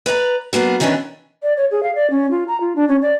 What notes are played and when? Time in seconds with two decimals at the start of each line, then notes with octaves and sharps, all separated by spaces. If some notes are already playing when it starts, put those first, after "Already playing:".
0.06 B4 D5 F5 A#5
0.53 F#3 A#3 B3 D4
0.80 D#3 E3 G3 B3 C#4 D4
1.43 D5
1.57 C#5
1.71 G#4
1.83 F5
1.95 D5
2.11 C#4
2.31 F4
2.48 A#5
2.61 F4
2.76 D4
2.88 C#4
3.02 D5